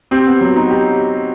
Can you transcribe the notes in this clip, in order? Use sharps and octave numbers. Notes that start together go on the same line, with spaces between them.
C4 G4
B3
F#3
D#4
G4